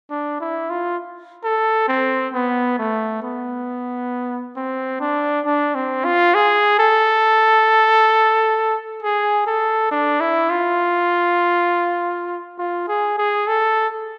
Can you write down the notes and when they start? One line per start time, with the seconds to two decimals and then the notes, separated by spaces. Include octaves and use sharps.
0.10 D4
0.40 E4
0.70 F4
1.44 A4
1.88 C4
2.33 B3
2.78 A3
3.23 B3
4.56 C4
5.00 D4
5.46 D4
5.75 C4
6.04 F4
6.35 G#4
6.79 A4
9.02 G#4
9.46 A4
9.91 D4
10.21 E4
10.50 F4
12.59 F4
12.88 G#4
13.18 G#4
13.47 A4